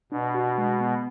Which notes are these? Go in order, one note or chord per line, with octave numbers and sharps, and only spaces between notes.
B2 D4
F#4
G#3
B3